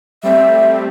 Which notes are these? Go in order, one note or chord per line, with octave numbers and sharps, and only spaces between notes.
G3 A3 C4 E5